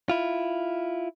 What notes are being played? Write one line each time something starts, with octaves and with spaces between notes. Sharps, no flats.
E4 F4